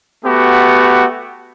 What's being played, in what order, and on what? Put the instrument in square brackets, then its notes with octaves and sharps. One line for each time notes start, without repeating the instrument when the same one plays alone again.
[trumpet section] A3 B3 F#4 G4